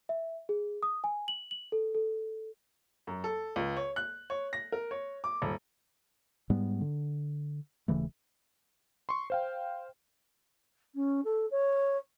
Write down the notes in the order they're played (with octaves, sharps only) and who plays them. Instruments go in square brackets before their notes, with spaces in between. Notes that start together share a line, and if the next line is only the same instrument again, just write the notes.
[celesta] E5
G#4
D#6
G#5
F#7
F#7
A4
A4
[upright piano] F#2
A4
C#2
C#5
F#6
C#5
A#6
A#4
C#5
D6
D#1
[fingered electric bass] G#2 G3 G#3 B3
D3
D#1 C#3 E3 A3
[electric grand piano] C6 C#6
C5 F5 G5
[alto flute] C#4
A4
C#5